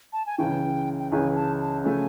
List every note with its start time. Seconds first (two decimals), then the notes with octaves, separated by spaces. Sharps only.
0.13 A5
0.26 G#5
0.38 C#2 C#3 E3 G5
0.99 G5
1.11 C#2 C#3 E3 G#5
1.35 A5
1.61 A5
1.84 C#3 F3 A3 G#5